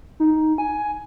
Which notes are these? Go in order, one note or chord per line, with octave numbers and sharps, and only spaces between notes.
D#4
G#5